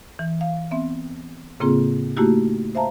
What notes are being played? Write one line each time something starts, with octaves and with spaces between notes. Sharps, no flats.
E3
F5
B3 C4 E5
A2 C#3 A#3 C4 F4 G#4
A3 A#3 D#4 E4 F#4 G4
C5 E5 F5 A5 A#5